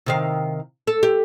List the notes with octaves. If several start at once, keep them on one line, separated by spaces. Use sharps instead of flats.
C3 D#3 F5
A4
G4